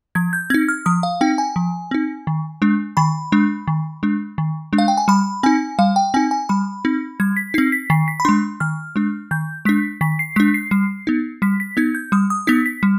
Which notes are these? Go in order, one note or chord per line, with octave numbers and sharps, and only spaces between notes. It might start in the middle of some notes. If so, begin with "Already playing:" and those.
F3 G#6
G6
C4 D#4 G#6
F6
F3 D#6
F5
C4 D#4 G5
G#5
F3
C4 D#4
D#3
G#3 D4
D#3 B5
G#3 D4
D#3
G#3 D4
D#3
G#3 D4
F5
G5
G#5
G3 B5
C4 D#4 G#5
G3 F5
G5
C4 D#4 G#5
G#5
G3 B5
C4 D#4
G3 G#6
B6
C4 D#4 C7
B6
D#3 C7
B6
B5
G#3 D4 C6
D#3 F6
G#3 D4
D#3 G6
G#3 D4 B6
D#3 B6
C7
G#3 D4 B6
C7
G3 C7
B3 D#4
G3 B6
B6
B3 D#4 G#6
G6
G3 D#6
D#6
B3 D#4 B6
B6
G3